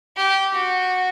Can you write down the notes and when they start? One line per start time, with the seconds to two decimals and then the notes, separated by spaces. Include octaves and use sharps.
0.17 G4
0.54 F#4